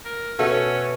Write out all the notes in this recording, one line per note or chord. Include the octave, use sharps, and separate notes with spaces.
A#4
B2 C#4 F#4 A4 E5 F#5 G#5